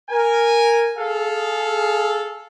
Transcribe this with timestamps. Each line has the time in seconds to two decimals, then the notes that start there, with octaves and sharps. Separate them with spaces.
0.11 A#4 G#5
0.98 G#4 A4 F5